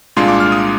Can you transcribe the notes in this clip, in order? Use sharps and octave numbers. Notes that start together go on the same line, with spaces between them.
C2 A#2 G#3 D4 F4 C6
D6
F6
D#6